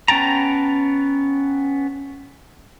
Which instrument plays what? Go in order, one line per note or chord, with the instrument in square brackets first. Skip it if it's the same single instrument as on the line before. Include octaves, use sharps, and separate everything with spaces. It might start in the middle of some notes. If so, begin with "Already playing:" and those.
[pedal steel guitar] B3 C#4 G5 A5 A#5